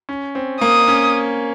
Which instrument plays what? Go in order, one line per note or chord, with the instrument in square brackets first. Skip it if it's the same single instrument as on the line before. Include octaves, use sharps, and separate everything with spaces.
[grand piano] C#4
C4
[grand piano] A#3 [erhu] D#6
[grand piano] C#4